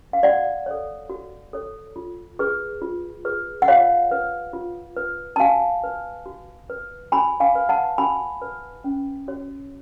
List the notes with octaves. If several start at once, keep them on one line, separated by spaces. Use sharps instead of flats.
F5
F#4 D5 F#5
A4 C#5
F#4
A4 C#5
F4
G#4 B4
F4
G#4 B4
F#5
F4 C#5 F5
B4
F4
B4
A5
F#4 F5 G#5
B4
F#4
B4
F#4 G#5 B5
F5 G#5
B4
F#5 A5
F#4 G#5 B5
B4
C#4
F#4 C#5